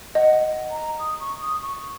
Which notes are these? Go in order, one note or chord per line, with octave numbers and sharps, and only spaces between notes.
D#5 F#5
A#5
D#6
C#6
D#6
C#6